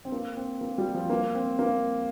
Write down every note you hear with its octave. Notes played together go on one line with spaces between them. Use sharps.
C4
A#3
C4
A#3
G3
F3
A#3
C4
A#3